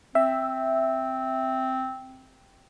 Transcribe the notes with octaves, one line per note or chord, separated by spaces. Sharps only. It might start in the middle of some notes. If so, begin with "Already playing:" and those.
C4 E5